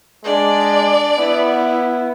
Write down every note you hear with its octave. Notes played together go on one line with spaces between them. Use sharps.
G#3 D4 D5
B3 E4